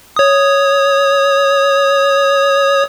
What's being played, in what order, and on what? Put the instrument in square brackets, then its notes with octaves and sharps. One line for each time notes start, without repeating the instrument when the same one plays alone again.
[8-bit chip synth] C#5 D#6